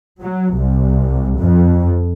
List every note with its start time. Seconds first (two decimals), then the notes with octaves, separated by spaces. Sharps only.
0.22 F#3
0.55 C2
1.40 F2